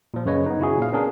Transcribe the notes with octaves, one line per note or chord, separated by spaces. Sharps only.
A#2 F3
F#2 C#3 B4 C#5 D#5
B3 D#4
C#3 E4 F#4 G#4
A#2 F5
B3 C#4 D4 G#4 A#4